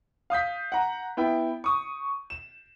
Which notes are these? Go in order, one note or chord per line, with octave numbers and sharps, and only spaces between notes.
F5 D#6 G6 B6
F#5 A#5
B3 E4 G5
C#6 D#6
E7